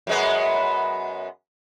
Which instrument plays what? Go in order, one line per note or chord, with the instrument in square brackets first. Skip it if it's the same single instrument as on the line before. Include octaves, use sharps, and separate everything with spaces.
[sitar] F#2 G#3 B3